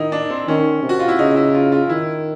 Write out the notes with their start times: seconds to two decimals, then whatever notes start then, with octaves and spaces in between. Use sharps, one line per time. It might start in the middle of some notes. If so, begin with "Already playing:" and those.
Already playing: D#3 D#4 E4
0.12 D4
0.30 C4
0.48 D#3 C#4
0.82 C3
0.89 F#4
0.99 F4
1.08 E4
1.18 C#3 D#4
1.36 E4
1.54 F4
1.72 F4
1.89 D#3 E4